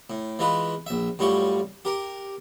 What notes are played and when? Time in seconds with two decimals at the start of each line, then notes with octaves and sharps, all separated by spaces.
0.10 A2
0.39 E3 G#3 F4 B4
0.86 A#1 E5
1.19 F#2 A2 G3 F4 C#6
1.85 G4 A#4